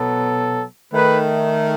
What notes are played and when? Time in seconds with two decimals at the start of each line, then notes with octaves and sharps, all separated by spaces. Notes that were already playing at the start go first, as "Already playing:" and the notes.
Already playing: B2 F#3 B3 A4
0.93 D#3 A3 B4